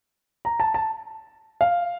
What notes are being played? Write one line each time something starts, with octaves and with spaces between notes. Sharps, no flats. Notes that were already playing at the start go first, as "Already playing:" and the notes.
A#5
A5
A5
F5